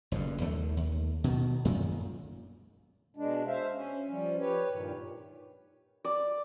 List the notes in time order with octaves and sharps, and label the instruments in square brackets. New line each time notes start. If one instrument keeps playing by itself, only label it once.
[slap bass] F#1 D2 G2
D#2 A3
D#2
B2 D#3
F#2 A#2 D#3
[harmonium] B2 G#3 D4
C5 E5 F5
C#4
F3 G3 C#4
G4 B4 C#5
G2 A#2 D#3
[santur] D5